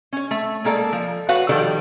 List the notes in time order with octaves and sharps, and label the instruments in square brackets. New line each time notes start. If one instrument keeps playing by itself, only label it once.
[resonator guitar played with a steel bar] C#4 C#5
A3
G#3 A#3 A4 D5
F3
F#4 B4 C#5 F5 F#5
D#3 F3 G3 A4 D5